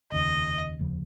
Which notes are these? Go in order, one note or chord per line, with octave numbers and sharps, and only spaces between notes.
F1 D#2 C#3 D#5
F1 D#2 C#3 F3